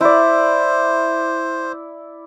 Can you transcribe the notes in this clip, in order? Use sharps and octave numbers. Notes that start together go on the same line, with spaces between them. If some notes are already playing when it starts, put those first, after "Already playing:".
E4 C5 D5